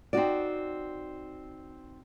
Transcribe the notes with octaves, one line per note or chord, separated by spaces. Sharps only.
C4 D#4 F#4 D5